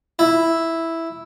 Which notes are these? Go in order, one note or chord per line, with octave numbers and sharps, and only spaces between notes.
E4